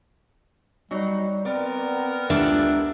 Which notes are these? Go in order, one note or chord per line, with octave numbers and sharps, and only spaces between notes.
F#3 G3 D#4
B3 C4 A#4 D5
C#2 A#3 D4 G4 A4 E5